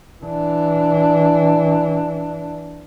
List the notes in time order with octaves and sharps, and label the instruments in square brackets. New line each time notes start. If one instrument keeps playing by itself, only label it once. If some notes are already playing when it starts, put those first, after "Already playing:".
[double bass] E3 D4